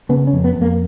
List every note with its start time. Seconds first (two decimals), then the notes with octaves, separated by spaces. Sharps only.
0.09 C#3 B3
0.27 C#4
0.33 F2
0.44 B3
0.56 F2
0.62 A#3